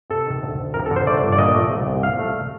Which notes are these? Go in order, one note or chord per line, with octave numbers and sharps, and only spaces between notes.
C3 A4
D#3
D2
D2
F2 A#4
A4
D3
C5
A3 D5
G1
D5
A#2 D#5
A3
C2
C2
A#2 F5
A3